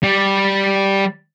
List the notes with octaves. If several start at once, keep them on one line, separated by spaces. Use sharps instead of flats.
G3